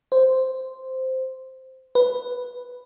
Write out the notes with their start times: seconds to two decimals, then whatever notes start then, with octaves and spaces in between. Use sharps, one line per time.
0.12 C5
1.95 B4